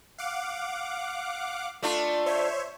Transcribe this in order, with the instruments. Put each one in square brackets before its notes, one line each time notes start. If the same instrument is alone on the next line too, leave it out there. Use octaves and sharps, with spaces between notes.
[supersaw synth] F5 F#5 D6
[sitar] A3 D4 F4
[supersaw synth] C5 C#5 E5